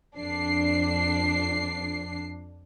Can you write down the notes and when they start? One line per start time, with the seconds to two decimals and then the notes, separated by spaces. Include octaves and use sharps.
0.16 F2 D4 C7